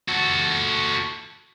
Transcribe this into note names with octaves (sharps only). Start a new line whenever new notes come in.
F#4 A4